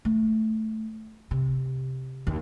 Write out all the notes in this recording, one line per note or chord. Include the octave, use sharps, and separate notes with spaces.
A3
C3
D#2